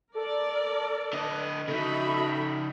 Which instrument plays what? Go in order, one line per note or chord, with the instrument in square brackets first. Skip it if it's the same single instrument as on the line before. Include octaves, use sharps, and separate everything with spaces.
[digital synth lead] A4 [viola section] A#4 D5
[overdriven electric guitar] D3 D#5 [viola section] B4
[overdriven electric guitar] C#3 D#4 [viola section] F#4 E5 B5 [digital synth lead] A4